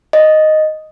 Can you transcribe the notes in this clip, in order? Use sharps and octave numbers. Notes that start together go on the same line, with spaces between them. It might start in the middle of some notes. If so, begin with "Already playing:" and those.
D#5